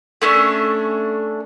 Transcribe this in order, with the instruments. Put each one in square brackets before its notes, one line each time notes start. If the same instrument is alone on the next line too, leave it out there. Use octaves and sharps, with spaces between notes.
[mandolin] A3 C#4 D4